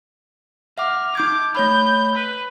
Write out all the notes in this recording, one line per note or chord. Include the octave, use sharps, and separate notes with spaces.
E5 F#5 D6 F6
D#4 D6 G6 G#6
A3 C#5 B5 G6
B4